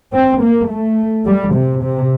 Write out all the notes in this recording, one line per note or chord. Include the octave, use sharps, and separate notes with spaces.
C4
A#3
A3
G3
C3
C3